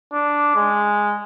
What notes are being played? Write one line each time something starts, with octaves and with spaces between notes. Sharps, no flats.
D4
G#3